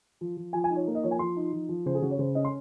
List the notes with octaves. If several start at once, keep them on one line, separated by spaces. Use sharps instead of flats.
F3
F3
F3 G#5
G#5
D#4
C#5
A#3
D#5
F3 C#5
G#5
F3 C6
D#4
F3
F3
C#3 C5
G#4
C#3 F#4
C#5
C#3 C5
C#4 D#5
C6